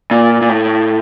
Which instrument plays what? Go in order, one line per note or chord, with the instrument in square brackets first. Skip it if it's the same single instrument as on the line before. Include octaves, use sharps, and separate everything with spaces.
[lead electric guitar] A#2
A#2
A2